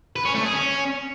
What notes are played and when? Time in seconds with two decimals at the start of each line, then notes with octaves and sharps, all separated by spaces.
0.16 B4
0.25 C#4
0.35 A3
0.44 G#4
0.54 C#4